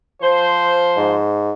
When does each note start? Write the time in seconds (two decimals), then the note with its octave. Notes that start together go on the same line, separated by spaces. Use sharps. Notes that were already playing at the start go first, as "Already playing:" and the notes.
0.22 F3 C5
0.97 G#2